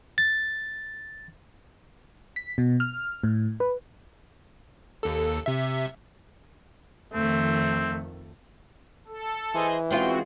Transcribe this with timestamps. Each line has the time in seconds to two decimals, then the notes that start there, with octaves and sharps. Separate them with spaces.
0.18 A6
2.36 B6
2.58 B2
2.80 F6
3.24 A2
3.60 B4
5.03 D#2 A4
5.46 C3 E5
7.14 F2 D#3 A3 C4
9.07 A4
9.55 E3 G#4 C5 D#5
9.91 G#3 C4 C#4 F4 F#4 G5